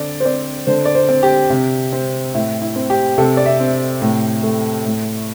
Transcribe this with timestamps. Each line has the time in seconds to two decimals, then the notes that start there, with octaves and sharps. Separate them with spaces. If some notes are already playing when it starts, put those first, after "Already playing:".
Already playing: D3 C4 D5
0.20 C5
0.25 C4 D5
0.67 D3 C5
0.85 D5
0.95 C5
1.09 C4
1.23 G4
1.50 C3
1.93 C4
2.34 A2 E4
2.62 E4
2.76 C4
2.90 G4
3.18 C3 A4
3.37 D5
3.46 E5
3.60 C4
4.02 A2
4.43 A3
4.86 A2